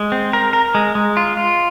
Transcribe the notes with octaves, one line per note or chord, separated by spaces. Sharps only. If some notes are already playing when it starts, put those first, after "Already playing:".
Already playing: G#3
C4
A#4
A#4
G#3
G#3
F4
F4